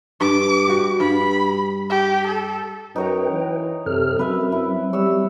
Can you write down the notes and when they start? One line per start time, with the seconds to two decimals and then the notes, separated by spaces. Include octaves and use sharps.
0.21 G2 D6
0.67 G3 F#4
1.00 G2 B5
1.90 G4
2.28 A4
2.96 F#2 D#4 B4 C#5 G5 A#5
3.30 E3
3.86 F#2 C3 A4 F6
4.19 F#2 F#3 C4 B4 E5
4.52 E4
4.93 G3 C#5 E6